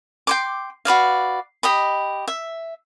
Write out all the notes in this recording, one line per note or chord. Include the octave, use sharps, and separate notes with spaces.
G5 C6 D6
F#4 B4 D5 F5
G4 D#5 B5
E5